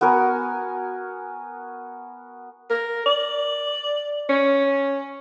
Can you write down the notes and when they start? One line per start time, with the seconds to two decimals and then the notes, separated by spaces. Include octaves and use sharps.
0.01 B3 F#4 A#4 G#5
2.70 A#4
3.06 D5
4.29 C#4